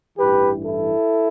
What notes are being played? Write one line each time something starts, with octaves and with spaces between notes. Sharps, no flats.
A1 G2 E3 G4 B4
E4 A4